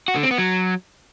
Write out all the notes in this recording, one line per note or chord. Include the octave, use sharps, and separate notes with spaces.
F#4
D3
C4
B3
F#3